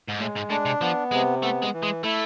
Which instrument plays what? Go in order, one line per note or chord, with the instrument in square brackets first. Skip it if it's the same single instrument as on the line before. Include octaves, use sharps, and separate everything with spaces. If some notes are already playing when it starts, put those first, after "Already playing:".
[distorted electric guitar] G#2
[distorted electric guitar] A2 [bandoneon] G#3
[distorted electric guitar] G#2
[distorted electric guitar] A2 [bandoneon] D4
[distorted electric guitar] C3
[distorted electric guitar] F3 [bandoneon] B3
[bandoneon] C3 [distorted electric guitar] G#3
[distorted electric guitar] A3 [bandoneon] B3
[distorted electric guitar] G#3
[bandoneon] E3
[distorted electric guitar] G#3
[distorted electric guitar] A3 [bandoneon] E4